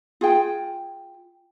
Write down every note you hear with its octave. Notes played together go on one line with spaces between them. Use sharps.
F4 G#4 G5